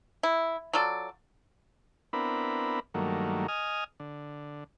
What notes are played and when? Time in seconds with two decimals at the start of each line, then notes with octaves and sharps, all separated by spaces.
0.23 E4
0.73 F#3 F4 A4 D5
2.13 B3 C4 D4 E4 A#4 B5
2.94 G2 D#3 F#3 A3 A#3
3.48 D#5 G#5 D#6 F6
4.00 D3